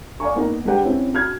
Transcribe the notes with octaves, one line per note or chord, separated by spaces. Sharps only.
D5 F5 G#5 C#6
A#3 B3 D#4 A#4
G#3 D4 G4 B4 F#5 G5
C4 C#4 E4
F#4 F6 G#6